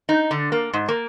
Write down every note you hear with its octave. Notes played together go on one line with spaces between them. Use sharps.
D#4
D3
A#3
G#2
A#3